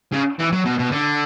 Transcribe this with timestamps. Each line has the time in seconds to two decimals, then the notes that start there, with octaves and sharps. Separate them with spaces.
0.12 C#3
0.39 E3
0.52 F#3
0.65 B2
0.79 B2
0.91 D3